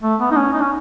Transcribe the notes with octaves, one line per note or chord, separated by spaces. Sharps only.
A3
B3
D#4
C#4
D#4
C#4